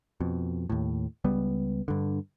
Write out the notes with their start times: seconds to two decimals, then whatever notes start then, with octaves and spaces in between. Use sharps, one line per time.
0.20 F2 B2
0.70 D#2 A2
1.24 C#2 G3 B3
1.88 G2 D3